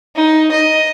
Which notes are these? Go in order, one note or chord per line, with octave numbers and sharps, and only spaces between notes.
D#4
D#5